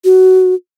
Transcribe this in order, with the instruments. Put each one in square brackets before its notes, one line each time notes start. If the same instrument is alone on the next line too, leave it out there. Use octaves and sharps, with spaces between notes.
[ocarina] F#4